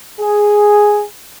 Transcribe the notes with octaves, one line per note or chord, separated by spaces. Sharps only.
G#4